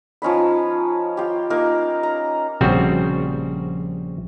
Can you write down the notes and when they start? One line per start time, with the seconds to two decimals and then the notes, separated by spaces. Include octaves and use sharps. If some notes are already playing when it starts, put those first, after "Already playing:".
0.22 F3 C#4 D#4 B5
1.17 F4 G4
1.50 A#3 D#4 A#4
2.03 A#5
2.61 A#1 C#3 G3 C4 F#4